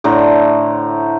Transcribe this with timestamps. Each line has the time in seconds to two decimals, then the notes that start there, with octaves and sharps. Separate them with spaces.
0.04 A2 D3 C5 A#5